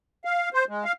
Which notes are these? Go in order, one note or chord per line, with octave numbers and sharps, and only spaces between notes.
F5
C5
G#3
F5